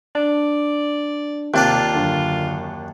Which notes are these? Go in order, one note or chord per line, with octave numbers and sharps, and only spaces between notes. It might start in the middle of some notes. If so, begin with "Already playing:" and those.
D4 D5
D#2 C3 D4 F4 D5
F#2 D3